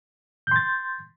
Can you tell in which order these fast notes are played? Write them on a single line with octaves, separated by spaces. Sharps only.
G6 C6 A6